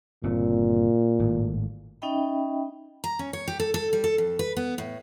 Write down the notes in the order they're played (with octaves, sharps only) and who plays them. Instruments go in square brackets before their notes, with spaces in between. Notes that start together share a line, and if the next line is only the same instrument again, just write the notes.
[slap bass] G1 C#3 C4 [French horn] A#2
[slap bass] G#1 A2
[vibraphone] C#4 D#4 D#5 E5 G5 B5
[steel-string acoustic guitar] A#5
C#4
C#5
G4
A4
A4
G3
A4
F2
B4
B3
A2